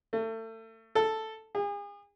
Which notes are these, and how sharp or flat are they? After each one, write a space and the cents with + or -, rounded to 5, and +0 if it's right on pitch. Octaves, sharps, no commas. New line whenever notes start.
A3 +30
A4 +0
G#4 -40